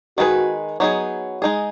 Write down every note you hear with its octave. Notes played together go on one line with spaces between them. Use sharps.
D#3 G#3 B3 F#4 G#4 B4
F#3 B3 D#4 G#4
G#3 D#4 G#4